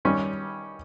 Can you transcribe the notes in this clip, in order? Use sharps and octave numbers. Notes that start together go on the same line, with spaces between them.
G2 D#3 G3 C#4